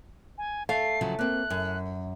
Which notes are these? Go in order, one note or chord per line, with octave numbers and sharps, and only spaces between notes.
G#5
A3 F5 C7
C#3 F3 F#3
A#3 C4 F#6
F#2